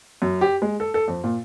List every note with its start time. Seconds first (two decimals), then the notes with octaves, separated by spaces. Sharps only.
0.22 F#2
0.41 G4
0.62 G#3
0.80 A4
0.94 A4
1.08 F2
1.24 A#2